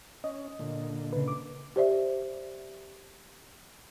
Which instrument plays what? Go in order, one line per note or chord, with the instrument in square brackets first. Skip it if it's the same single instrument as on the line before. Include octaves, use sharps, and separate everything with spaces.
[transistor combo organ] C#4 [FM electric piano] D#5
[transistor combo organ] A#2 D3
[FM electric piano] C#3 B4
D6
[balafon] G4 C5 D5 E5